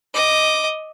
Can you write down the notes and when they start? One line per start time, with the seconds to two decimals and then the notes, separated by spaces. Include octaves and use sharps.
0.14 D#5 D6